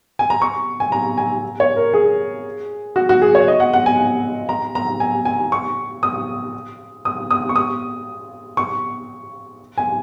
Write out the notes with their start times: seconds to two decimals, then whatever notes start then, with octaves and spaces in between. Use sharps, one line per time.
0.19 G#5
0.30 A#5
0.42 C#6
0.80 G#5
0.92 A#5
1.18 G#5
1.60 C#5
1.77 A#4
1.94 G#4
2.96 F#4
3.09 F#4
3.22 G#4
3.35 C#5
3.48 D#5
3.60 F#5
3.73 F#5
3.86 G#5
4.49 A#5
4.75 A#5
5.00 G#5
5.25 G#5
5.52 C#6
6.03 D#6
7.05 D#6
7.31 D#6
7.49 C#6
7.56 D#6
8.57 C#6
9.78 G#5